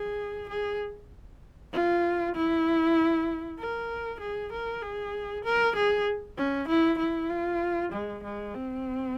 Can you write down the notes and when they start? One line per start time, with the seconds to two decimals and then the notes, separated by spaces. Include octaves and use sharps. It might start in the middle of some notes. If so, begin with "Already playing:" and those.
Already playing: G#4
0.49 G#4
1.73 F4
2.36 E4
3.59 A#4
4.20 G#4
4.52 A#4
4.83 G#4
5.44 A#4
5.76 G#4
6.37 C#4
6.68 E4
6.99 E4
7.30 F4
7.92 G#3
8.24 G#3
8.55 C4